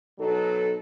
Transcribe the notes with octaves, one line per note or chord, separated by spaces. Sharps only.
B2 F#3 D#4 A4